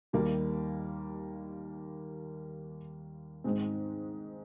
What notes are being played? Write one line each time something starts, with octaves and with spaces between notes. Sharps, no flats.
D#2 D#3 G3 A#3
G#2 D#3 G#3 C4